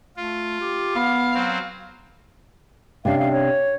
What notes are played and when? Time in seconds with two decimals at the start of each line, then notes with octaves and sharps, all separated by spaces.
0.17 A3 F4
0.61 G4
0.95 B3 F5
1.35 F#3 C4
3.05 C3 C#4 D4 F5
3.19 F5
3.32 C#5